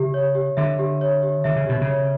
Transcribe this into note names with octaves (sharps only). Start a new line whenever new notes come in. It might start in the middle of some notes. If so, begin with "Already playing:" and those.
Already playing: C#3 G4 E5
C#5
G4
D3 E5
G4
C#5
G4
D3 E5
C#3
B2 G4
C#3
C#5